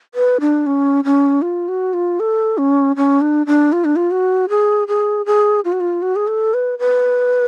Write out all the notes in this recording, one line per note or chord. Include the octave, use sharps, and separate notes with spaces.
B4
D4
C#4
C#4
F4
F#4
F4
A4
C#4
C#4
D4
D4
F4
D4
F4
F#4
G#4
G#4
G#4
F4
F#4
F4
F#4
G#4
A4
B4
B4